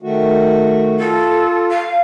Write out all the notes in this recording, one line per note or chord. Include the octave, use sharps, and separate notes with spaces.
D#3 A3 F#4
F4 A4
F5